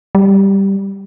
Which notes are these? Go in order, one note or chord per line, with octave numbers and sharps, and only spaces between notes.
G3